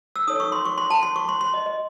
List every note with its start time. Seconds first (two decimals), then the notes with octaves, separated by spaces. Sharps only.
0.16 E6
0.27 D#4 A4 C#5 D#6
0.40 C#6
0.52 C6
0.65 C#6
0.78 C6
0.90 A5
1.03 C6
1.16 C#6
1.29 C6
1.41 C6
1.54 D#5
1.66 D#5